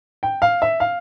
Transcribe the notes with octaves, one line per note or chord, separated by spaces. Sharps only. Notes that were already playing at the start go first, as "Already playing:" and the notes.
G5
F5
E5
F5